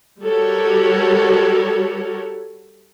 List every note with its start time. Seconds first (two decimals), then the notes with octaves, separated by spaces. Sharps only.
0.24 G3 F#4 G4 A4 A#4 C#5